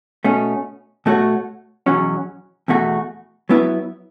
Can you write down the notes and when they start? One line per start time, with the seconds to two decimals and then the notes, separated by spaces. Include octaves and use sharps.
0.24 B2 A3 C#4
1.06 B2 A3 F#4 C#5
1.86 E2 B2 F#3 C#4
2.68 E2 B2 A3 F#4
3.49 F#3 B3 E4 B4 E5